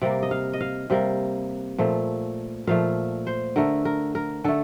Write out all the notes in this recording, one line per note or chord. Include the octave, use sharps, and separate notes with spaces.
C3 G3 A#3 D5
D#5
F5
D#5
F5
C3 G3 A#3
A#2 F3 A3
A#2 F3 A3 F5
C5
D3 A3 A#4
A#4
A#4
D3 A3 A4